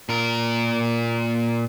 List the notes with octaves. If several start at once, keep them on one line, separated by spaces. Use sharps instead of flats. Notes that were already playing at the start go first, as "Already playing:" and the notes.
A#2 A#4